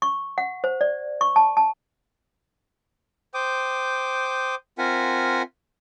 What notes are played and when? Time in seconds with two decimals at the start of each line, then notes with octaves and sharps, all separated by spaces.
0.02 C#6
0.38 F#5
0.64 C5
0.81 D5
1.21 C#6
1.36 A5
1.57 A5
3.34 C5 G5 D6 D#6
4.78 C4 F4 A#4 E5 F#5 G#5